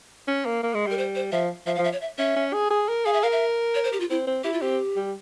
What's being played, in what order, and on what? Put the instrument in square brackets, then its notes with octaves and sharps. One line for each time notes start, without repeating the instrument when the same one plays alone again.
[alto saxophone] C#4
A#3
A#3
G#3
[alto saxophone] G3 [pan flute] A#4
[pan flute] C5
C5
[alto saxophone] F3 [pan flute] E5
[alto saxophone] F3 [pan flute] E5
[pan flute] F5
[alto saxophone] F3
[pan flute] E5
C#5
E5
[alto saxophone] C#4 [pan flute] E5
[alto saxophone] C#4
G#4
G#4
A#4
[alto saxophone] G#4 [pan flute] F5
[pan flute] E5
[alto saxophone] A#4 [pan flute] F5
[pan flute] E5
C#5
C5
G4
F4
[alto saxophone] C4 [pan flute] E4
[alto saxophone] C4
[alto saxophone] E4 [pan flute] G4
[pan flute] F4
[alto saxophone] C4 [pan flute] G4
[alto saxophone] G3